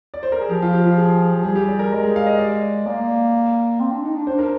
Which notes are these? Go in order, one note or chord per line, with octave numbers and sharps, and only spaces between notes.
D5
C5
A#4
G#4
F3 G4
F4
G4
F4
G#4
F3
G3 G#4
G4
D5
A#4
G#3 A#4
G#4
F5
D#5
D5
A#3 D5
C4
D4
D#4
D4
D4 C5
A#4